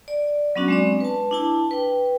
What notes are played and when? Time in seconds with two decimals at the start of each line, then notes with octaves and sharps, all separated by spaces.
0.08 D5
0.56 F#3 B3 C#4 D4 F#4
0.68 G#3 C4 D5
1.00 B4 A5
1.31 D4 E4 A5
1.71 B4 G5